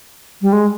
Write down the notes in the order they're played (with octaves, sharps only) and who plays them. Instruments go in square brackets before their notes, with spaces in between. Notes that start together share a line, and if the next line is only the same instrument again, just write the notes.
[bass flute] G3
G#3